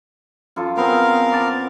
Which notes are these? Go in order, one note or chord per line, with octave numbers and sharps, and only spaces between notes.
F#2 F4 A4
B3 C4 G#4 A#4 F5
D5 A5